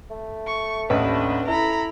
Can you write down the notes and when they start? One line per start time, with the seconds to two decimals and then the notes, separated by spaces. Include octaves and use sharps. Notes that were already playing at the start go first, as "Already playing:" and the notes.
0.10 A3
0.47 C#6
0.90 A1 D#2 D4 B4 D#5
1.48 E4 A4 A#5 B5